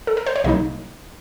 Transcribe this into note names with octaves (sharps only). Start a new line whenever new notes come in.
A4
A#4
C5
C#5
C2 C3 F#3 A#3 D#4 D#5